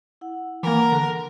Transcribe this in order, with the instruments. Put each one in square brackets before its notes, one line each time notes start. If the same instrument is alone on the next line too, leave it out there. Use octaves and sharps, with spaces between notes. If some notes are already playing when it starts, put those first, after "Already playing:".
[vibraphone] E4 F#5
[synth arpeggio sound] E3 A#3 [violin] A#4 [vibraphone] F#5 A#5
[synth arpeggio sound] D3